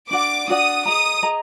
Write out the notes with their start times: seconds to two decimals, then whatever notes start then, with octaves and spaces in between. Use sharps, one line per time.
0.11 D4 F#4 D5 F#5 D6
0.48 D4 F#4 D5 F#5 D#6
0.85 G#4 D#5 A#5 D#6
1.22 G#4 D#5 A#5